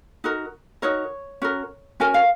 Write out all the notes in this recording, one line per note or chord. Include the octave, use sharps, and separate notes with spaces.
D#4 F#4 A#4
D#4 F#4 A#4 C#5
C#4 F#4 A#4
C#4 F#4 A#4 G#5
F5